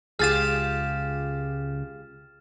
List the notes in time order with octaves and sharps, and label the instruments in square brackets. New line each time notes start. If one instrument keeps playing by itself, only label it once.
[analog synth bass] C#2 [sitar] F4 G4 G#4 [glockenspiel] F6 A6 E7